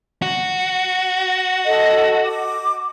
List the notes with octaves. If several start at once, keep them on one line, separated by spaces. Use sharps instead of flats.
F#4
A4 D#5
D6